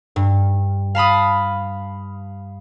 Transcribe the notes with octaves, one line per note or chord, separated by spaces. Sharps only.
G2
F5 A5 B5 D#6